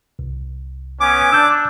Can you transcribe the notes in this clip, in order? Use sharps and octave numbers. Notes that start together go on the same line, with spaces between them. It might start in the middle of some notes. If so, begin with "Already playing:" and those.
C2
B3 C#4 G#5 D6
D4 E6 G6